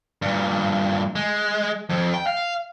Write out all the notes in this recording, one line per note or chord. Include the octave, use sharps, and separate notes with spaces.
G2 A#2
G#3
F2
G5
F5